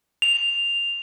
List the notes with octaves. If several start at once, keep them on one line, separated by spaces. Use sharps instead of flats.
F7